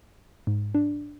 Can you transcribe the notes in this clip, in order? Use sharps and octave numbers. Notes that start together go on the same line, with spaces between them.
G#2
D4